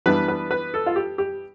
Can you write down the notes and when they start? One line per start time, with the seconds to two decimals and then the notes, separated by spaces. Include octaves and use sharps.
0.06 E3 G3 B3 D4 B4
0.28 B4
0.51 B4
0.74 A4
0.86 F4
0.96 G4
1.18 G4